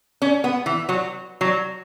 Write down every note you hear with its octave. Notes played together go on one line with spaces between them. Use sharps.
C#4
B3
E3
F#3
F#3